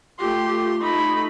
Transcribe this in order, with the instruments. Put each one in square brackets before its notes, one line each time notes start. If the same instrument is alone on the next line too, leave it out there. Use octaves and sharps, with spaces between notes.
[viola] A3 G4 [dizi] F4 [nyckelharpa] C6
[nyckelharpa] A3 B5 [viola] D#4